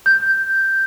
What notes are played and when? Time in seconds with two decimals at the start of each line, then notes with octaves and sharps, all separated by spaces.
0.06 G6